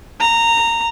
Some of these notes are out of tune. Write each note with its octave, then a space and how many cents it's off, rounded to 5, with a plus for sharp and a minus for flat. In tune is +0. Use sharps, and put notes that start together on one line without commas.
A#5 -15